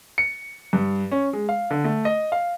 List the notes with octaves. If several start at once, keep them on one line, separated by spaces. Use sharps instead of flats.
C#7
G2
C#4
G#3
F5
D3
A3
D#5
F5